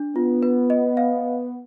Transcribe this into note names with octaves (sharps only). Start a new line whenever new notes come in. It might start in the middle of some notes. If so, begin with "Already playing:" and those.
Already playing: D4
B3 F4
B4
D#5
F5